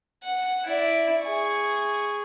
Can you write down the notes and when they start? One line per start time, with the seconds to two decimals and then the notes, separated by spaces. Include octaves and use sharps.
0.23 F#5
0.64 E4 D5
1.21 G#4 C#6